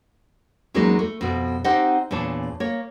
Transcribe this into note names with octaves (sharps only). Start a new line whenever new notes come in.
E2 F#3 G#3 A#3 C#4 D#4
A3
F2 B2
C4 D#4 G4 C5 D#5 F#5
E2 A#2 D4 C#5 A5
A#3 C#5